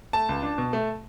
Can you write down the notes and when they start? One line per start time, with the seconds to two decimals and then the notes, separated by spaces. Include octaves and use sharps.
0.13 A3 A5
0.29 C#2
0.43 D4
0.58 B2
0.73 A3